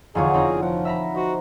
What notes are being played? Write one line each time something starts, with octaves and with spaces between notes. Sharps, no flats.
F1 E2 D3 D#4 F4 G#4 C#5
C4 C#4 D#4 D5 A#5
F3 F#5
E5 A#5 B5
D#4 F#4 C5